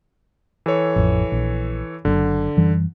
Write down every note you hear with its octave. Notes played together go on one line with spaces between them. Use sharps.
E3 A4 C#5
A1 F2
A#1
F#1 F#2 D3
F#2 E3 G3